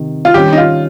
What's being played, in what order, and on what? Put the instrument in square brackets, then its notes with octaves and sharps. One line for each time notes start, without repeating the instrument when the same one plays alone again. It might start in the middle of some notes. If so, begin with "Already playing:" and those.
Already playing: [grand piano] C3 D#3
[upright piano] F4
[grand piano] D#3 G3 C#4 [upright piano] G4
[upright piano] D#4
F4